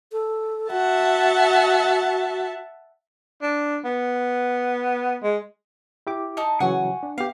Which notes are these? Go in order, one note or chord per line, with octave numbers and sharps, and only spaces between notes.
A4
F#4 E5 F#5 A5
D4
B3
G#3
E4 G4 D6
D#4 A5
C#3 E3 F#3 F#5 G#5 C#6
D4
B3 G4 F5